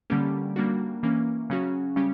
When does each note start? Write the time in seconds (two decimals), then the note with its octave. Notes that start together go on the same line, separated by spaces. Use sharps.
0.10 D3 G3 A#3 C#4 G4
0.56 G3 A#3 D4 F#4
1.03 E3 A#3 C#4
1.50 C#3 F#3 C#4 F#4
1.96 C#3 G3 C#4 G4